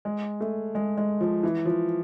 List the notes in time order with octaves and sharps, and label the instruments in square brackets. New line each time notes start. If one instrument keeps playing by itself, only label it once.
[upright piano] G#3
A3
G#3
G#3
F3
E3
F3